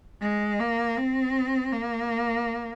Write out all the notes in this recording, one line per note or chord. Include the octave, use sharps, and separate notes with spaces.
G#3
A#3
C4
A#3